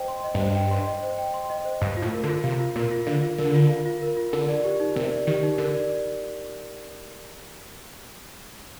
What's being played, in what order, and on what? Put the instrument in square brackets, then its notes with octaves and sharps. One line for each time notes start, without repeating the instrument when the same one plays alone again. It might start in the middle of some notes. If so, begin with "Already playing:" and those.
Already playing: [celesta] C5 D#5 G5
C6
D#5
[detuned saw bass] G2
[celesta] C5
G5
C6
D#5
C5
G5
C6
D#5
C5
[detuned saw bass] G2 [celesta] F5
[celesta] F4
[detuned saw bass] A2
[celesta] A#4
[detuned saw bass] D3
[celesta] F4
[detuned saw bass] C3 [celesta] F5
[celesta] F4
[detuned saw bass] A#2 [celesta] A#4
[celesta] F4
[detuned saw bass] D3 [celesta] F5
[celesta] F4
[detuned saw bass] D3 [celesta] A#4
[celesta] F4
F5
F4
A#4
F4
[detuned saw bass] D3 [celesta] A#4
[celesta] D5
G4
D#4
[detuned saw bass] C3 [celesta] A#4
[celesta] D5
[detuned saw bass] D#3 [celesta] G4
[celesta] D#4
[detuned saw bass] D3 [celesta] A#4
[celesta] D5